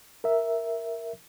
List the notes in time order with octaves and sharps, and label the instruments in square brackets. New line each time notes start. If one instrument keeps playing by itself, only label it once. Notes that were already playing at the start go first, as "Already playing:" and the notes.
[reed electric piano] A#4 E5